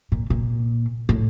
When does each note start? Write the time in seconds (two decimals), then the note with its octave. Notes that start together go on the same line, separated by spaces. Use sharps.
0.12 A#2
0.30 A#2
1.09 A2